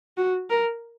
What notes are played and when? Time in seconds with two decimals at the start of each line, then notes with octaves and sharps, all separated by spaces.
0.17 F#4
0.50 A#4